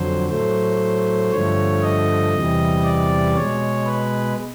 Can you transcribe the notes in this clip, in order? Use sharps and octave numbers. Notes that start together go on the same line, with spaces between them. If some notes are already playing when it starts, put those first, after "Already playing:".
Already playing: F2 D3 F#3 C5
A2 F#3 A3 C5
G2 D3 F3 A3 C#5
D#5
E2 C3 E3 G3
D5
B2 G#3 C#5
B4